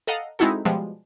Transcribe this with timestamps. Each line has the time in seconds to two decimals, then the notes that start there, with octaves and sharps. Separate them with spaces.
0.07 A4 D#5 F5 F#5 A#5
0.39 G#3 C4 D#4 E4 F#4 A4
0.65 B2 F3 G3 G#3